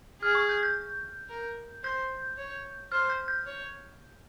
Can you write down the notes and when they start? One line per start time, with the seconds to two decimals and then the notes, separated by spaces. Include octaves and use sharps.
0.22 G#4 F6
0.35 C#6
0.49 G6
0.63 G6
1.29 A#4
1.84 C5 G6
2.38 C#5
2.92 C5 F6
3.10 G6
3.28 G6
3.46 C#5